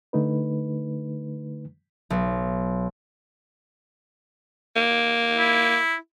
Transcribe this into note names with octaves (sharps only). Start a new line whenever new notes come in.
D3 A3 D#4 B4
B1
A#3
E4